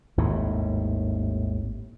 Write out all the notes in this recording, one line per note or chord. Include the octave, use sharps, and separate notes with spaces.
G#1 D#2 A2 C3